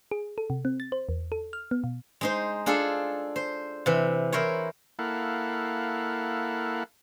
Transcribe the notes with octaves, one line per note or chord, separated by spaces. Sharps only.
G#4
A4
C3
C4
A6
C5
E2
A4
F6
B3
B2
G#3 D#4 C5
D4 F4 G#4 A4
C5
C3 E3
E4 A#4 C5 C#5
A#3 E4 A4 F5 F#5